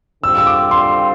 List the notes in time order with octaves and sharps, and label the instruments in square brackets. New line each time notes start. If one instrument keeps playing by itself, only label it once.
[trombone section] D3 G3 C4 F4 C5 [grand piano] E6
[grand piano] E6
D6
C6